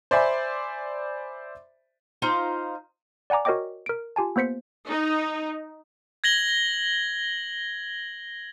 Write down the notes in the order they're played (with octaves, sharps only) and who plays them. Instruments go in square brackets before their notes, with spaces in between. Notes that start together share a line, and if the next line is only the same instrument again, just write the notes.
[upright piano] C5 D5 E5 G#5 B5 C6
[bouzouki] D#4 F4 C5 A#5
[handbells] D5 F#5 G#5 A#5 D6
F#4 A#4 C#5 D#5 G5 D6
A#4 D7
F4 G4 G#5 A5
A#3 B3 C5 B6 C#7
[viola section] D#4
[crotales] G#6 A#6 F#7 G7